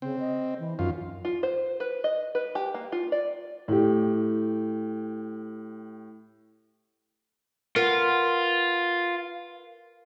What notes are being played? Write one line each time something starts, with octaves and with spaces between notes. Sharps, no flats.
C#3 C4
D#5
E3
F#2 D#3 F4
F4
C5
B4
D#5
B4
G4
A#3
F4
D5
A2 G4
F4 A#4 B4 F#5